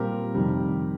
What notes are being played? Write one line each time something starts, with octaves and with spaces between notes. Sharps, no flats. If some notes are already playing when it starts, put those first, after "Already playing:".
Already playing: A#2 G3 C4 G4 A#4
F2 C3 D#3 G3